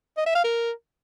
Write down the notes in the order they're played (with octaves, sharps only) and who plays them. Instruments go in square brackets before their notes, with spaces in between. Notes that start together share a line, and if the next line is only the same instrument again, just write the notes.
[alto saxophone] D#5
E5
F5
A#4